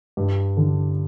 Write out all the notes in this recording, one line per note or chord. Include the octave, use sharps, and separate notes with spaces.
G2
D3